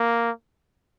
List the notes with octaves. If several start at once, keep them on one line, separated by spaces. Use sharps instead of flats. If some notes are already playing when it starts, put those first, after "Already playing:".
Already playing: A#3